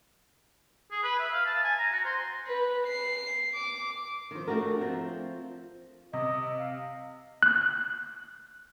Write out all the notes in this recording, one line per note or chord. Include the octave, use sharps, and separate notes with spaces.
G#4
B4
E5
F5
A5
G#5
A#5
F#4
C5
B4
C7
D6
D#3 F3
A3 D4 F#4 G4 A#4
F3 C4
C3 D#5
F5
F#6